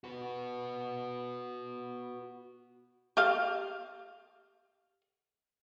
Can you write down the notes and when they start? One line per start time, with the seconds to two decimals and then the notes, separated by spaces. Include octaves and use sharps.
0.04 F#4 B4
3.17 G4 D#5 F5